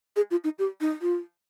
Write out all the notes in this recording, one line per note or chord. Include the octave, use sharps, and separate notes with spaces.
G#4
F4
D#4
G4
D#4
F4